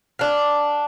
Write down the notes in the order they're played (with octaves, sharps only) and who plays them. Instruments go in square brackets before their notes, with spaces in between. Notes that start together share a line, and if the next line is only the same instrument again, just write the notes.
[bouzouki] D4 F5